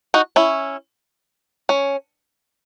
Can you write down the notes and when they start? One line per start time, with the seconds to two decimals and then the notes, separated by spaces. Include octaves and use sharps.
0.14 D#4 F#4
0.36 C#4 E4
1.69 C#4